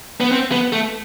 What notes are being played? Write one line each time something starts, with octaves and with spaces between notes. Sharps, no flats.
B3
C4
B3
A3